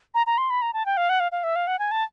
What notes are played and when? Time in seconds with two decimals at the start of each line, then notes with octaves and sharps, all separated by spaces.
0.15 A#5
0.27 A#5
0.38 C6
0.50 B5
0.62 A#5
0.74 A5
0.86 G5
0.97 F5
1.09 F#5
1.20 F5
1.32 F5
1.44 E5
1.56 F5
1.67 F#5
1.79 G#5
1.91 A5